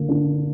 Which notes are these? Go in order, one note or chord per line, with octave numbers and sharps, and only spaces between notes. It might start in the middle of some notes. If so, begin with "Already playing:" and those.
Already playing: D3 A#3
D4